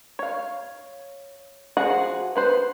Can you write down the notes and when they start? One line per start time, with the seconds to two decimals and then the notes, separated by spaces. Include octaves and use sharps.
0.19 C#5 F5
1.77 F3 F#4 G#4 F#5
2.36 B3 B4 C5